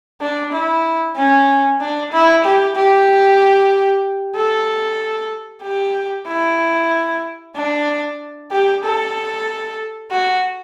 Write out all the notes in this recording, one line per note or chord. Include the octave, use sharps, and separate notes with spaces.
D4
E4
C#4
D4
E4
G4
G4
A4
G4
E4
D4
G4
A4
F#4